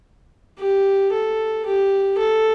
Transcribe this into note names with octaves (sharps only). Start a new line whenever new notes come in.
G4
A4
G4
A4